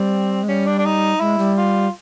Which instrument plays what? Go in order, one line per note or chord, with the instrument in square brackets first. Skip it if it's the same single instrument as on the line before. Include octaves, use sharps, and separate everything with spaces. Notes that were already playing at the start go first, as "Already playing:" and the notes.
Already playing: [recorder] G3 [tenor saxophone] C4
[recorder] G#3
[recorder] G3 [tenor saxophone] C#4
[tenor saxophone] D4
D4
D#4
[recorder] G#3 [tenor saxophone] E4
[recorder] G3
[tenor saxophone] F4